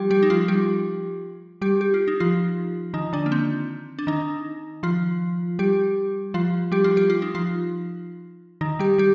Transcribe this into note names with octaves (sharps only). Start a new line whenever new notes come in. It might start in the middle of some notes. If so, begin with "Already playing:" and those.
Already playing: F3 G3 F4 G4
G3 G4
D#4
F3 F4
G3 G4
G3 G4
G4
F4
D#4
F3 F4
D#3 D#4
D3 D4
A#3
C4
D4
D#3 D#4
F3 F4
G3 G4
F3 F4
G3 G4
F3 F4
G3 G4
F4
D#4
F3 F4
D#3 D#4
G3 G4
G3 G4